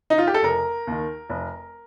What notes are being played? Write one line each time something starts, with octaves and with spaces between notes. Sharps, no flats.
D#4
F4
G4
A4
F1 A#4
D#2 D#3
F1